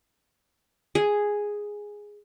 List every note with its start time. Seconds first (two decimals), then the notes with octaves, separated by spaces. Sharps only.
0.95 G#4